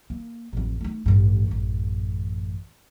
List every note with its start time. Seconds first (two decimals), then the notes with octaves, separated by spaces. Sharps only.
0.10 A#3
0.53 A1 F2
0.81 A3 D#4
1.06 A1 G2
1.48 A1 F#2